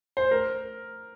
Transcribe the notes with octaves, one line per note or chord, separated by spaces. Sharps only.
C5
A#4